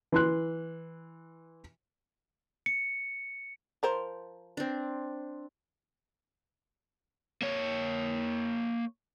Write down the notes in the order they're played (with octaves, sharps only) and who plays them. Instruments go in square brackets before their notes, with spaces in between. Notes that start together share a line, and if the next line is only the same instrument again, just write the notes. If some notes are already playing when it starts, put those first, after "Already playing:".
[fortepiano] E3 C6 F#6
[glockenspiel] C#7
[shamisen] F3 A#4 C5
[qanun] C4 D4
[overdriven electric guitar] A#3 C#5